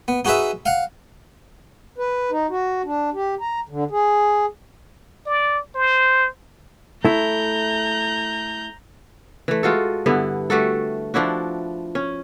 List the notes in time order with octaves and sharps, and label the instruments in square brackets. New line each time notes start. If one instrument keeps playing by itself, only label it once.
[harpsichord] B3
D#4 F#4 G#4 B4 E5
F5 F#5
[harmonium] B4
D#4
F#4
D4
G4
A#5
D3
G#4
[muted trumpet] D5
C5
[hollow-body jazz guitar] A3 E4 [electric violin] A#5 G6
[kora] E3 A3
G#3 F4 F#4 A4
G2 D3 B3 E4
G3 A3 F#4 A4
F3 D4 E4 F#4
C#4